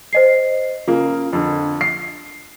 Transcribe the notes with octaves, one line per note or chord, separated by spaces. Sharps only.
C5 D#5 C7
C#3 A#3 F4
F2 D3
C7